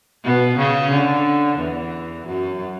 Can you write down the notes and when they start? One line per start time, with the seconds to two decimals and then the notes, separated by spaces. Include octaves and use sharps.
0.24 B2 B3
0.58 C#3 C#4
0.92 D3
1.59 E2 E3
2.27 F#2 F#3